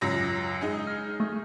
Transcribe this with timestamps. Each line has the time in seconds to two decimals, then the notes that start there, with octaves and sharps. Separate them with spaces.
0.01 C#2 F#2 A#6
0.61 G#3 D#4 G#4
0.87 F6
1.20 A3